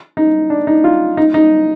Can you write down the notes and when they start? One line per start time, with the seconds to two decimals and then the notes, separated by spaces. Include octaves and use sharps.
0.17 D#4
0.50 D4
0.67 D#4
0.84 F4
1.17 D#4
1.34 D#4